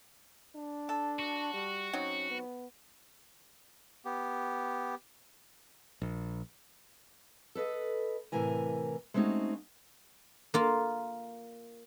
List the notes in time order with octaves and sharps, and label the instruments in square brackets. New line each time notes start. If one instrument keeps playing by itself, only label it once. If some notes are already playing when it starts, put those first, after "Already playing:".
[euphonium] D4
[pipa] A4
[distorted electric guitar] F#4
[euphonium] G3
[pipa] F#3 C4 D#4 [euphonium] C#4
[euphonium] B3
[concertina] B3 G4
[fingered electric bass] A#1
[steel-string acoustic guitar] A4 B4 D5 D#5
A2 C3 E3 A#4 G#5
G#3 A3 C4 C#4 D#4 F#4
[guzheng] A#3 F4